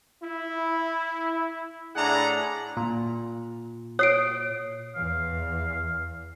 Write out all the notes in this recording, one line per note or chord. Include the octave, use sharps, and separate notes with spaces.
E4
A2 D4 E4 G#4 F#5 A#5
A#2
C#5 D#6 C7 D7
E2 F5